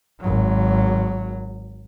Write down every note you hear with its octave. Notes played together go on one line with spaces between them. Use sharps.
G#1 F#3